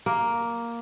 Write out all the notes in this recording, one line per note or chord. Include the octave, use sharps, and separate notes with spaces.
A#3